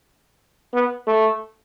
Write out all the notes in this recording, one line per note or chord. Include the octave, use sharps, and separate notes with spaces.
B3
A3